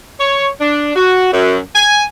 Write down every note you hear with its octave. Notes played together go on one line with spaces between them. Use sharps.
C#5
D4
F#4
F#2
G#5